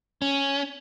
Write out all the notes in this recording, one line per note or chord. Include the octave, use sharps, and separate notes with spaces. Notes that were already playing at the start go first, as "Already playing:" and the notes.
C#4